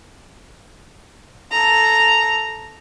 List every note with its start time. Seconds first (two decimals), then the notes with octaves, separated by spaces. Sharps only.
1.51 A4 A#5